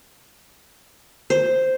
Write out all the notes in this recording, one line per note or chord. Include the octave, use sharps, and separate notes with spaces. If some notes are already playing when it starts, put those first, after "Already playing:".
C5